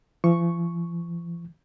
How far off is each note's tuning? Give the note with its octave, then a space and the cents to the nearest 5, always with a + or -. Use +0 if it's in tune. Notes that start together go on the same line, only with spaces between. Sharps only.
F3 -45 C#6 +0